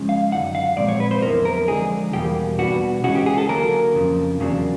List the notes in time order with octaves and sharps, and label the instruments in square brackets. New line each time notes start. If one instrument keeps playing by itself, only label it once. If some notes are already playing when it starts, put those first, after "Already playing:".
Already playing: [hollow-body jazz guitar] C#3 F3 G#3 C#4
F5
F#2 D3 F#3 D#4 F#5
F5
A#2 F3 G#3 C4 D5
C#5
B4
C5
F2 D3 F#3 B3 E4 A#4
A#4
D3 F3 G#3 G#4
E2 B2 G3 A#3 G4
B2 G3 B3 D4 F#4
C#3 E3 G#3 C#4 F#4
G4
G#4
A4
D3 F#3 A#3 A#4
F2 C#3 F3
E2 C#3 F#3 A#3 D4